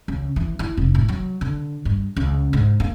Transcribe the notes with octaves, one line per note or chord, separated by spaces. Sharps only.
C#2
E3
E4
F1
A2
F#3
D3
G2
C#2
G#2
A#3